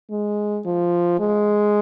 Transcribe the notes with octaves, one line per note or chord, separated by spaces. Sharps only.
G#3
F3
G#3